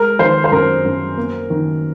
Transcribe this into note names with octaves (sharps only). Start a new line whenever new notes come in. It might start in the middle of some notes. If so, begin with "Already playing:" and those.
Already playing: G#3 A#4
D#3 C5
C5
F#2 A#4
F#2
A#3
D#3